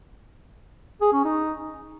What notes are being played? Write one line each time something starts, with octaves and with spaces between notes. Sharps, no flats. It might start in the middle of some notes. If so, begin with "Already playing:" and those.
G#4
C#4
D#4